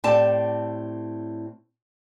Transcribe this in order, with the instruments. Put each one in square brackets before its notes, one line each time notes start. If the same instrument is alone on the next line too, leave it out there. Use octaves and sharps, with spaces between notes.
[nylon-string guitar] A2 C4 G4 A4 D5 A5